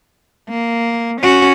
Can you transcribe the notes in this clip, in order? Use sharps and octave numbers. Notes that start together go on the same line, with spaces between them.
A#3
C#4 F#4